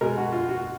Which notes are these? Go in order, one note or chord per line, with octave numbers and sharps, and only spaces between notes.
B2 G#3 A#4
F#4
F4
F#4